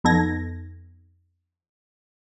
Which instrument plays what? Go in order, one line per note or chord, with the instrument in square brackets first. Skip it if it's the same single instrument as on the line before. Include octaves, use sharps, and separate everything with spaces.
[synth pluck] F2 B3 D#4 A4 G#6 A#6